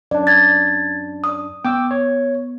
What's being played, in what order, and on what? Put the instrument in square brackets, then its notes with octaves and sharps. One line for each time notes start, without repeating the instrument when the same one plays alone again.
[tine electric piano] F#2 D4 [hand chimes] D5
[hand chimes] G#6 A6
D5 D#6
[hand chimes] B3 [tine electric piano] G5 D6 E6
[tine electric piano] C#5